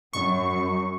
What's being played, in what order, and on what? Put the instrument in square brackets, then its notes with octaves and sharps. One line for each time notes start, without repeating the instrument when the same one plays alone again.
[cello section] F#2 [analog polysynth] C#6